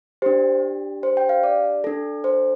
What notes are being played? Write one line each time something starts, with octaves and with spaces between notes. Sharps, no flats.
D4 G4 C5
C5
G5
F5
D5
D4 A4
C5